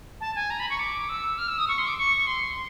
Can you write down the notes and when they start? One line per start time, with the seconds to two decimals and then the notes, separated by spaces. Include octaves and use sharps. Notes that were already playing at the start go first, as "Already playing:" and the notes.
0.21 A5
0.36 G#5
0.50 A#5
0.60 B5
0.70 C#6
0.80 D6
1.09 E6
1.38 F6
1.48 E6
1.58 D#6
1.68 C#6
1.78 C6
1.87 D6
1.98 C#6
2.27 C6